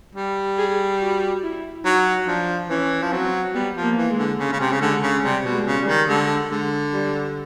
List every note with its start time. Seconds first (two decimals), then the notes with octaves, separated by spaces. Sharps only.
0.15 G3
0.58 G#4
1.01 F#4
1.43 E4
1.84 F#3 D#4
2.27 F3 D4
2.69 E3 C#4
3.02 F3
3.12 F#3 C4
3.54 G3 B3
3.76 F3
3.82 A#3
3.97 E3
4.10 G#3
4.18 D3
4.38 C#3 G#3
4.52 C#3
4.60 C3
4.72 C#3
4.81 D3 G#3
5.02 C#3
5.23 C3 G3
5.44 B2
5.52 G#3
5.65 C#3
5.81 G3
5.88 D#3
6.08 D3 G#3
6.51 D3 G#3
6.93 G3